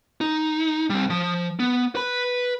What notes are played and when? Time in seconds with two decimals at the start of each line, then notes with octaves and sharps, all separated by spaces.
0.21 D#4
0.90 G3 C4
1.10 F3
1.60 B3
1.95 B4 B5